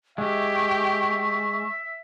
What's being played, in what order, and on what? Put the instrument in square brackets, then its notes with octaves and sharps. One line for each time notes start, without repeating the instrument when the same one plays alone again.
[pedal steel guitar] G#3 [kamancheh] G4 [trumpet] E5 [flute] C#6